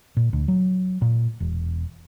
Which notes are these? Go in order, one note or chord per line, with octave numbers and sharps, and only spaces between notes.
A#2
D2
F#3
A#2
E1